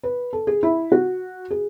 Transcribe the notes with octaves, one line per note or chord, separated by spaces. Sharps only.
B4
A4
G#4
E4
F#4
G#4